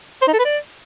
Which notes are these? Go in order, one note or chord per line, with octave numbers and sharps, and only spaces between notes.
C5
D#4
A4
B4
D5